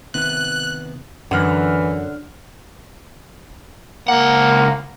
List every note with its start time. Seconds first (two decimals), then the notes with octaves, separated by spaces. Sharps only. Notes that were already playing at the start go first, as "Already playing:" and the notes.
0.14 C3 D#3 B3 F#6
1.31 F#2 D3 E3 F#5 F6
4.08 C#2 A#3 F#5